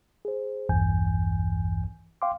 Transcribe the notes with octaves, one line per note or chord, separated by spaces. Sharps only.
G#4 C5
A#1 E2 G2 E3 G#5 G6
F5 G5 C6 D6